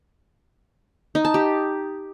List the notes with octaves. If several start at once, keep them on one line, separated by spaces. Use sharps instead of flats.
D#4
A5
G4